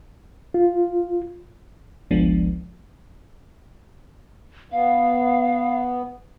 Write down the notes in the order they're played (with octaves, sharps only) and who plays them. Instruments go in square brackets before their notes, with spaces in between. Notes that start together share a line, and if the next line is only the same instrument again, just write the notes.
[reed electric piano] F4
[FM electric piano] G1 C#2 F3 G#3 B3 D4
[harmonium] B3 [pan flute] F5